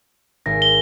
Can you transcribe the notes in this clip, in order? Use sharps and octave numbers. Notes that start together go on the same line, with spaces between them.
G#1 A#6
G7